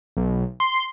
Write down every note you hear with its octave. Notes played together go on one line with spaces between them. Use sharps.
B1
C6